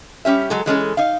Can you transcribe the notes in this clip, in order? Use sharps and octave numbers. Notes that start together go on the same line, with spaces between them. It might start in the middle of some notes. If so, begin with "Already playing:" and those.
G3 C#4 G4 E5
F#3 G#3 A4
E3 G#3 C#4 A4
D#4 F5